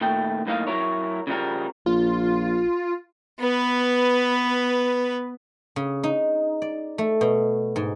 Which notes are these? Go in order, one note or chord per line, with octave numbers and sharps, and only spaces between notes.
A#2 D#3 A3 G5
B1 A2 F3 A#3 D#4 F5
F#3 E4 A#4 C#5
C#3 F3 G3 A#4
A#1 F4
B3 B4
C#3
D#4
D5
A3
B2
G#2